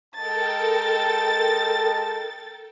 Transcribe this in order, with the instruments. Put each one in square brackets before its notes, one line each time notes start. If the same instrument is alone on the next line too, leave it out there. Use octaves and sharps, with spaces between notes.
[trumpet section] G#3 D#5 A5 [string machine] A4 A#4 G5 [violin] A6